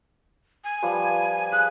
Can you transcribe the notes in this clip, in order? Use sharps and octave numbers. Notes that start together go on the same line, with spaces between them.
G#5
F3 G3 B4
G#4 F#6